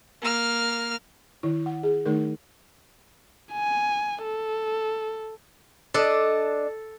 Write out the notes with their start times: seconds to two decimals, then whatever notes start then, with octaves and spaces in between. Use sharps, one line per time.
0.22 A#3 F6
1.43 D#3 E4
1.66 F#5
1.83 G#4
2.06 D#3 A3 D#4 A#4
3.53 G#5
4.24 A4
5.94 D4 A4 D#5